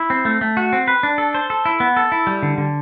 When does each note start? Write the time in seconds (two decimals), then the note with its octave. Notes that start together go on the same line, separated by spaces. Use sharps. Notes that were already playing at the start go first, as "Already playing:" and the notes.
Already playing: E4
0.10 C4
0.25 A3
0.41 A3
0.57 F#4
0.73 C4
0.88 B4
1.03 D4
1.18 A4
1.35 C5
1.50 A4
1.65 E4
1.80 B3
1.97 A4
2.12 E4
2.27 G3
2.43 D3
2.58 D3